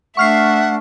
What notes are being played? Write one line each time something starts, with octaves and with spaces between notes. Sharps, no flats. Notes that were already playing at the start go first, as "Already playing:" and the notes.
A3 D4 E5 F#5 C#6 F6 C7